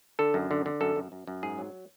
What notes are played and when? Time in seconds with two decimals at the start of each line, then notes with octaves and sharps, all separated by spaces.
0.19 D3 A4
0.34 F#2
0.51 D3
0.66 D3
0.81 F#2 A4
0.96 F#2
1.12 F#2
1.27 F#2
1.43 G#2 G#4
1.58 F#3